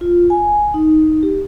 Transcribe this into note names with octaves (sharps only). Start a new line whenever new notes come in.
F4
G#5
D#4
G4